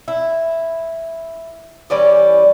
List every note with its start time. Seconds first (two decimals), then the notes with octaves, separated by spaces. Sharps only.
0.08 E4
1.90 E3 G3 C#4 D5